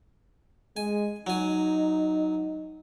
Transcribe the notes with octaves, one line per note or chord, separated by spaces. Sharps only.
G#3 G#5
F#3 D#4 G#5